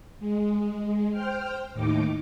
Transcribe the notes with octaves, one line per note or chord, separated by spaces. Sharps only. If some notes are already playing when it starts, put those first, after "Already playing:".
G#3
C5 G5 F6
D#2 A2 D#4 D6